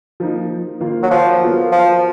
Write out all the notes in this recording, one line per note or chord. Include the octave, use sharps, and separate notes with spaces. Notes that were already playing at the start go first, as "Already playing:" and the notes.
F3 A#3 D#4
D#3 A#3 F4
F#3
F3
F#3 B3 F4 A#4
F3